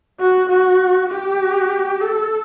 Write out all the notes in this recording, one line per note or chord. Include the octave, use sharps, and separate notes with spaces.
F#4
F#4
G4
A4